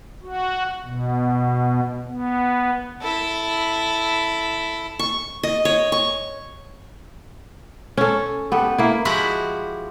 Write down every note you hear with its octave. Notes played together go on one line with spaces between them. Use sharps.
F#4
B2
B3
E4 A4
C#6
D#5
C#5
C#6
C#4 A4
B3 G4 A4
A#3 E4
F3 G#3 E4 F#4 G4 F#5